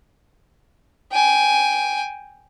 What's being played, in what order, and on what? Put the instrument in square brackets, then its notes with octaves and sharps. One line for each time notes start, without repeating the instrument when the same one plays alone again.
[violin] G5 G#5